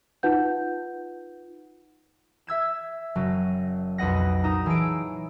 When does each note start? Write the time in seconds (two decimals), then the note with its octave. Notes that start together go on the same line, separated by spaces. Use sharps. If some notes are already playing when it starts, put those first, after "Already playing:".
0.23 D#4 F4 B4 F#5 G6
2.47 E5 E6 G#6 E7
3.15 F#1 F#3 D#7
3.98 B1 F2 B4 D#5 F#5 A#6
4.43 A#2 D#4 A#5 D#6 E7
4.66 E3 G#4 C#5 A5 E6 D7